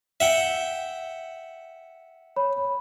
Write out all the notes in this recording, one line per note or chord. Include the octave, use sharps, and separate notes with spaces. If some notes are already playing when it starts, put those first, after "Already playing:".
E5 F#5 G5
C#5 B5